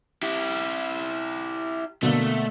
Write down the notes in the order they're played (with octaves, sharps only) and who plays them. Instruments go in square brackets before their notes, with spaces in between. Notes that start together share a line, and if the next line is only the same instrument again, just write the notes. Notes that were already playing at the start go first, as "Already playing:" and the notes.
[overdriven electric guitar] E4 G4
[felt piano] B2 D3 A#3 [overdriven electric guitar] A3